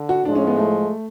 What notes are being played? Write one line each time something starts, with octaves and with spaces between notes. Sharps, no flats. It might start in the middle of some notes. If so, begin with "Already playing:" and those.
Already playing: D3
F#4
A2 F3 G#3 D4
C#4
B3
A3